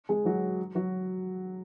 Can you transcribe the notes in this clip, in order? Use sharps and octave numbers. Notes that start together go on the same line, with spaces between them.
G#3 G#4
F#3 F#4
F#3 F#4